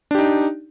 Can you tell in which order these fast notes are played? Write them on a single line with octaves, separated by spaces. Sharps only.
D4 G4 D#4